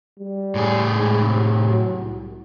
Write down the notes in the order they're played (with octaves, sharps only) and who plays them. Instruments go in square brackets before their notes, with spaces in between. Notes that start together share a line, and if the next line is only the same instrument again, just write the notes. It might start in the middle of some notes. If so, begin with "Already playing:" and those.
[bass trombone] G3
[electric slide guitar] A2 G#4
[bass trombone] G#2
C3
F#3
C2